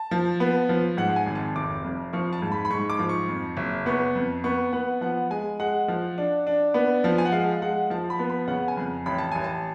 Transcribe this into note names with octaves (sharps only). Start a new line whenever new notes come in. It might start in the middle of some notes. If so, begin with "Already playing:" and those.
Already playing: A5
F3
B3
F3
G#2 F#5
G#5
G#1
A5
F1 D6
F2
F3 C#6
A5
G#2
B5
B5
G#2 C#6
D6
F3
C#6
F2
F#1
B3 C#6
F2
B3 C#6
B3 F#5
F3 F#5
G#3 G#5
G#3 F#5
F3
D4
D4
B3
F3
G#5
F#5
G#3 F5
G#3 F#5
F3 A5
B5
B3
B5
C#3 F#5
G#5
F2
A1 B5
A5
A1 G#5
A5